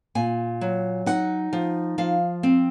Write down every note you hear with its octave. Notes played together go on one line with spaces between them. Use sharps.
A#2 G#5
F#3
D#4 F#5
F3
F3 F5
C4